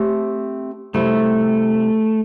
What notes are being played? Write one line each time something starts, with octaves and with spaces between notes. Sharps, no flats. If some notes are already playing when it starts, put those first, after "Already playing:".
Already playing: A3 C4 G4 E5
C3 G3 A3 E4